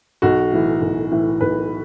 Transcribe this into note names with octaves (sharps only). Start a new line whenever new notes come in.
B1 F#4
A2 E3
B1
A2 E3
B1 B4